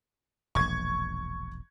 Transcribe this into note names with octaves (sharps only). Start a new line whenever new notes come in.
E1 A#1 C#6 G#6